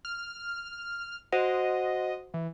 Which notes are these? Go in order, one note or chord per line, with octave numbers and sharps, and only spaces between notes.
F6
F#4 C5 D#5 F#5
E3